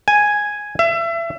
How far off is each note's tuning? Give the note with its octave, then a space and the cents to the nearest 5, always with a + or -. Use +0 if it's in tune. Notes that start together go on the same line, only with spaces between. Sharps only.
G#5 +0
E5 +30